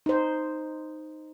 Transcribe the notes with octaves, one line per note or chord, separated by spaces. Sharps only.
D#4 C5